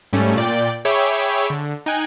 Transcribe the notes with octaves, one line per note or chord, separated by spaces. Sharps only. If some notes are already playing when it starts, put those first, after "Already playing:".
G#2 G3 A3 C#4
A#2 D5 G5
G#4 C#5 E5 G5 B5 D6
D3
D#4 G5 G#5 F#6